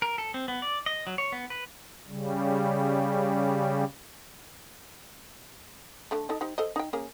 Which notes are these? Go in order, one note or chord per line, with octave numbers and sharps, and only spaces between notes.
A#4
A4
C4
B3
D5
D#5
F#3
C#5
B3
B4
C#3 G3
D3 A3
D#4 A4 D#5
D#4 G4 C5
A4 C5 D#5
D#4 G5
A#3 C#4 G#4